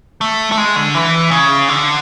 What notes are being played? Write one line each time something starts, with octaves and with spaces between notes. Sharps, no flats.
A3
A3
G#3
D3
E3
C#3
D3